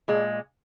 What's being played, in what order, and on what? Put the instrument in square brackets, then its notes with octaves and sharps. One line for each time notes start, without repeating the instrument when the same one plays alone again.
[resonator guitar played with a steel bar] A#2 G#3